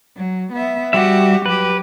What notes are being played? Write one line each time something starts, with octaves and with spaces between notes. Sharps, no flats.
F#3
B3 E5
G3 F#4 G4 E5
F#3 G4 B4